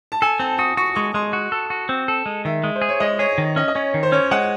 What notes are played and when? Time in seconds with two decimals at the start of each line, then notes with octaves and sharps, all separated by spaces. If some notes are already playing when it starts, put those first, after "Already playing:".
0.12 A5
0.22 A4 G#5
0.39 C4 A5
0.58 F#4 D#6
0.77 F#4 C#6
0.95 G#3 C#6
1.14 G#3 C6
1.33 F#4
1.52 A4
1.70 F#4
1.89 C4
2.08 A4
2.26 G#3
2.45 D#3 E5
2.64 G#3
2.76 C5
2.82 G#4
2.89 C#5
3.00 G#3 D#5
3.19 G#4 C#5
3.38 D#3
3.56 C#4 D#5
3.68 D#5
3.75 C#4 C#5
3.94 D#3
4.03 C5
4.12 C#4 C#5
4.31 G#3 F#5